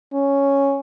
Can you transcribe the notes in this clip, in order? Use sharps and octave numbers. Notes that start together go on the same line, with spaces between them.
C#4